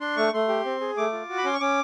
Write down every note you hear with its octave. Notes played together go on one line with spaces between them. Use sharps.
D4 C6
A3 C#6
A3 C6
G4
C4
G#4
A3 D6
F4
F#4
B5
C#4 C6
C#6
C#4 D6